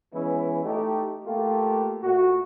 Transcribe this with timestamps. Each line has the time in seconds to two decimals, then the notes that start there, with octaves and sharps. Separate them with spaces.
0.12 E3 G#3 B3 C#4 E4
0.63 A3 D#4 G4
1.26 A3 A#3 F4 G4
2.03 A#2 A3 F#4